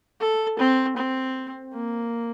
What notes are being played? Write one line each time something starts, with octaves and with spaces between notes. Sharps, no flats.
A4
C4
C4
A#3